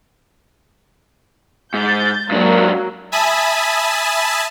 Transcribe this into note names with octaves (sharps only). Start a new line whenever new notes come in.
G#2 G6 A6
G#2 F#3 A#3 D4
E5 G#5 A5 B5 D#6